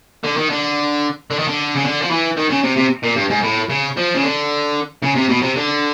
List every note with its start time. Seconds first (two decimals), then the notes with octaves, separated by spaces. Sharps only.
0.24 D3
0.37 D#3
0.50 D3
1.30 D3
1.39 D#3
1.48 D3
1.75 C#3
1.84 D3
2.02 F3
2.10 E3
2.37 D#3
2.50 C#3
2.64 C3
2.77 C3
3.04 A#2
3.16 G2
3.30 G#2
3.43 A2
3.70 C#3
3.97 F3
4.15 C#3
4.23 D3
5.03 C#3
5.16 C3
5.29 B2
5.42 C3
5.56 D3